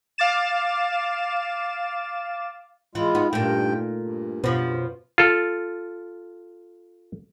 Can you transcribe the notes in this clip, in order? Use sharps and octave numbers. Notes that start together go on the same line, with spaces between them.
F5 D6 A6 E7
E3 G#3 F4
B3 D#4
G2 A#2 A3 G5
G2
F#2 B2 F3 B4 C5
F4 A4